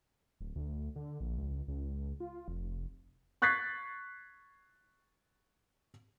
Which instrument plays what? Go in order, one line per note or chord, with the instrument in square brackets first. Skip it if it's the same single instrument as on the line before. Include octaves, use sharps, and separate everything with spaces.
[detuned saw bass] D1
D2
D3
A#1
C#2
C#2
F4
F1
[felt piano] C#6 F#6 G#6 A6 B6 C7